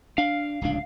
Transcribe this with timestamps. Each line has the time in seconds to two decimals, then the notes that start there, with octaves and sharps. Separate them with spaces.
0.18 D4 F5
0.61 D1 C#2 D4